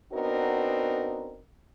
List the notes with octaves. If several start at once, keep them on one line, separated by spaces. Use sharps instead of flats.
B3 C4 D4 D#4 F#4 A#4